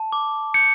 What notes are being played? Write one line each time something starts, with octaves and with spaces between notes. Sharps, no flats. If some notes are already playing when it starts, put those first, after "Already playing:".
Already playing: A5
D6
G6 C#7